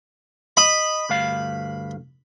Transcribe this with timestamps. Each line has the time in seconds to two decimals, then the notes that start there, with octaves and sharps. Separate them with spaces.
0.57 D#5 B5
1.09 D2 G2 F5